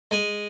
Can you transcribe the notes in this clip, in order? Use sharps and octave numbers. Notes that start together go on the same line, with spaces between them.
G#3 G#5